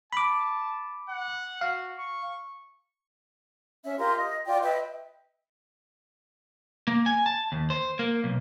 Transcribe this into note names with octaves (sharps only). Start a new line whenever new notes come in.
A5 B5 D6
F#5
F#4 F5
C#6
C#4 E5
F4 G4 A#4 C6
D#5
F4 D5 G5
B4 D#5 E5 G5
A#3
G#5
A5
D#2
C5
A#3
B1